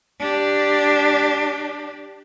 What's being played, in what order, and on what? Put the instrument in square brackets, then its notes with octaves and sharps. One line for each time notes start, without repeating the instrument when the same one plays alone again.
[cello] D4 G4